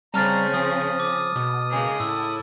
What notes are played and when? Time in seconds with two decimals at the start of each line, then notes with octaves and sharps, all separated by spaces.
0.14 C#3 G3 C4 C#4 A5 A#5 F6 A6
0.54 F3 D#6
1.00 D6
1.36 B2
1.70 C#3 G#3 A#3
2.00 A2 E4 A4 E6